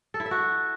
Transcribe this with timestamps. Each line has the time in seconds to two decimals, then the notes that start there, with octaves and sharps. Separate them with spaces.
0.14 A4
0.20 E4
0.25 E5
0.31 F#4